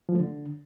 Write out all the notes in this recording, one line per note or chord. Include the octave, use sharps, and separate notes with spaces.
F3
A3
D3